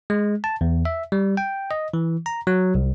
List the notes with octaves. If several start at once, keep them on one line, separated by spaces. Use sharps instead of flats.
G#3
A5
E2
E5
G3
G5
D#5
E3
A#5
F#3
C2